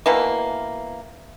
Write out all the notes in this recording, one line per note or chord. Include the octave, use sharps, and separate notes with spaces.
B2 E3 A#3